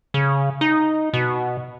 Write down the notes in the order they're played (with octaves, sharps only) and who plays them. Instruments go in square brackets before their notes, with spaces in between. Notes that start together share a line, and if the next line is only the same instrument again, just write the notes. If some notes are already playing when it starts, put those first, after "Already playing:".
[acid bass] C#3
D#4
B2